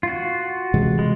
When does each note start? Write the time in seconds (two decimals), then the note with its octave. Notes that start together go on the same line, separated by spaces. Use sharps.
0.03 F4 F#4
0.74 C3 E3 G#3
0.99 G#3